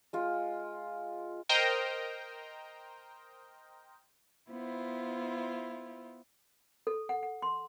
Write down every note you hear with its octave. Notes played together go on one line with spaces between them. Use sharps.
G#3 F4
A#4 C5 D#5 G5 A#5
B3 E4 F4 C5
A4
F#5
F#5
C6